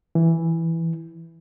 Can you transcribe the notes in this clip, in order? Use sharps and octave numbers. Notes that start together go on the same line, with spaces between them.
E3